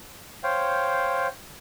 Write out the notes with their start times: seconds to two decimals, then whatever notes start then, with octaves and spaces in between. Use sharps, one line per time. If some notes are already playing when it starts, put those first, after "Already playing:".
0.43 C5 C#5 F5 G5